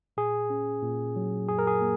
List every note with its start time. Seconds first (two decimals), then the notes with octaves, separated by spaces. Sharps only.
0.17 A#2 G#4
0.50 C#4
0.82 A#2
1.16 F#3
1.48 F#2 G#4
1.59 A#4
1.67 G#4
1.81 A#3